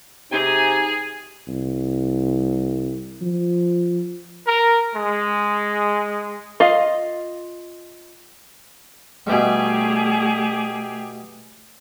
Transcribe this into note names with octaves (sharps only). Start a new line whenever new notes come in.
C3 D#4 G#4 G#5
C2
F3
A#4
G#3
F4 D#5 F5
B2 E3 G3 A3 G4 G#4